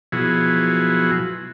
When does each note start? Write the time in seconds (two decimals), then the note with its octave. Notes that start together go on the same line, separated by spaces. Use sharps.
0.12 B2 F3 F#3 E4 F#4 G#4